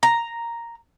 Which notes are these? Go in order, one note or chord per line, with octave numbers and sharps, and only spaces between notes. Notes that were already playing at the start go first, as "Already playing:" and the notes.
A#5